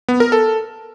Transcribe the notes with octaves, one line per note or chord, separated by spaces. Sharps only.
B3
A#4
A4